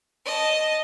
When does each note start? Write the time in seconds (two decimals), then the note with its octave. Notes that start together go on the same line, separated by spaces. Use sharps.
0.25 D#5 A5